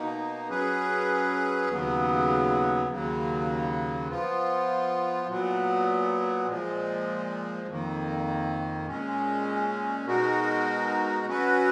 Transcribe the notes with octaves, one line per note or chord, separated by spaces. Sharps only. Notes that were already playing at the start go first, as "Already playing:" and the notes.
Already playing: B2 A#3 D#4
F#3 C#4 G#4 B4
D#2 C#3 F#3 B3
D#2 C#3 F#3 A#3
F3 B3 F4
A#2 F#3 B3
A#2 F3 G#3
F2 D#3 A#3
A#2 G#3 C#4
B2 G#3 D#4 F#4 A#4
F#3 C#4 F#4 B4